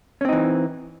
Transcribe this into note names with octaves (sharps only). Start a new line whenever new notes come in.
E3 C4 C#4 D#4